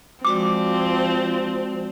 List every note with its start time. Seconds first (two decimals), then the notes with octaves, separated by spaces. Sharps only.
0.25 F3 G#3 C4 F#4 D5 D6